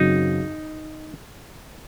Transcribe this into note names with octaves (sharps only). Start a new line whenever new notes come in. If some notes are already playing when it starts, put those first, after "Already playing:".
Already playing: F#2 C#3 F#3 C4 D#4 F#4